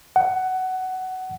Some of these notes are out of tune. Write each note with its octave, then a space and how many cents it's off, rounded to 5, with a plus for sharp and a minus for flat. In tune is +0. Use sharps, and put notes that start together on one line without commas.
F#5 +15